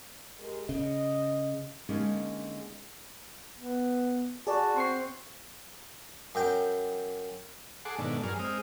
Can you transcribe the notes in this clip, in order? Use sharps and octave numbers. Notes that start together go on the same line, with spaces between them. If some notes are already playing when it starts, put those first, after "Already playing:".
G#3 G4 A#4
C#3 D#5
D3 G#3 A#3 C#4 D#4
B3
F#4 G#4 D5 A5
C4 C6 C#6 C7
F#2 G5
G#4 A4 F#5 C6 D6
G#2 B2 D#3 A3 D4
G2 F#3 G#4 A#4 F6
G#3 C4 D#6 F6